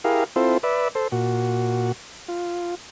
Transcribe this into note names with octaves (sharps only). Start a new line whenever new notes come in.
E4 G4 G#4 A#4 F5
C4 E4 F4 A4 C5
B4 D5 E5
A4 C5
A#2 F#4
F4